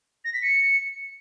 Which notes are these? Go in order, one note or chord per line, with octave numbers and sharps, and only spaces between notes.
A#6
B6
C#7